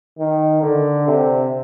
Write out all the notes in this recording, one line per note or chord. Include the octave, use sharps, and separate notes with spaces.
D#3
D3
C3